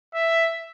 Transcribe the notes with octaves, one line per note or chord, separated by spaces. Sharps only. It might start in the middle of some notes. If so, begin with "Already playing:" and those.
E5